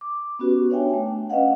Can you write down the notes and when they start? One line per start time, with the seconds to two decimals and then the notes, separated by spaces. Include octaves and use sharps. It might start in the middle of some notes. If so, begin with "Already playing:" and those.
0.01 D6
0.39 B3 C#4 F#4 G4 B4
0.70 D4 C#5 E5 G5 G#5
0.90 A3 G5
1.30 C#4 B4 D#5 F5 F#5